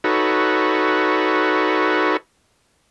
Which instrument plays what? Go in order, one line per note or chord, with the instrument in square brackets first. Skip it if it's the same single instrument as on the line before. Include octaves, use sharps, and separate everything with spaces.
[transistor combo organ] D#4 F#4 A4 B4 C#5